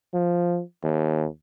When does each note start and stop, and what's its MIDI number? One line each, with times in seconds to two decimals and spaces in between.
0.14 0.62 53
0.83 1.26 39